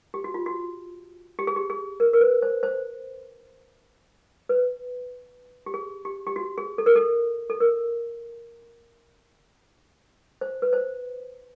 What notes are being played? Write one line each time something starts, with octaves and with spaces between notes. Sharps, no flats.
G4
F#4
F4
F#4
G4
G#4
G4
G#4
A#4
A#4
B4
C5
C5
B4
G4
G#4
G4
G4
F#4
G#4
A4
A#4
A4
A4
A#4
C5
B4
C5